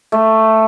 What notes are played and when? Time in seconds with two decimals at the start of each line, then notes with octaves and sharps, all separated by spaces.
0.12 A3